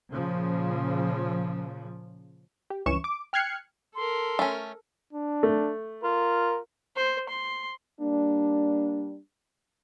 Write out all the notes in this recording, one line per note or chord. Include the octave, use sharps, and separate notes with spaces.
A#2 C#3 F3
G4
C#2 G2 E3 C#4 C#6 E7
D6
G5 F6 F#6 G#6 C7 C#7
A4 A#4 C6
A3 C#4
D4
A3
F4 A#4
C5
C6
G3 A#3 D4